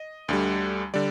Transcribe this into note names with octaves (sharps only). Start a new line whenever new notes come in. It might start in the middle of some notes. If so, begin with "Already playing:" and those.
Already playing: D#5
D2 D3 G3
D3 G3 D5